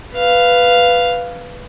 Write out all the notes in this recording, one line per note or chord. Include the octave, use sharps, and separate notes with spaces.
B4 F5